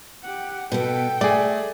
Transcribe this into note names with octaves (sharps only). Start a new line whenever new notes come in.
G4 F#5
B2 B3 A4 G5
A3 G#4 D5